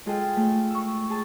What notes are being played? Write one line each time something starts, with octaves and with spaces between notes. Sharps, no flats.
G#3 F4 G#4 A4 G5
A3
C#6 E6
G#4 A5